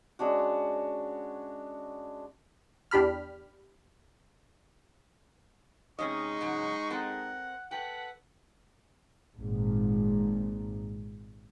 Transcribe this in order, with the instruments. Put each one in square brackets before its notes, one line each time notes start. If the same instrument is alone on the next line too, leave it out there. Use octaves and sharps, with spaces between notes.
[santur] G#3 C#4 D4 F#4
[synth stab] E2 D4 G4 B5 F6
[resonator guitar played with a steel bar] C3 C#4 D#5 [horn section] G#3 D#4 [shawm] C#6
[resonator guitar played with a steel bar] G#2 C#3 F#3
[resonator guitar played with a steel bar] C4 A4 A#4 [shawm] F#5
[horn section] A4 B4 F#5 [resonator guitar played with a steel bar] G5
[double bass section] G#1 A#2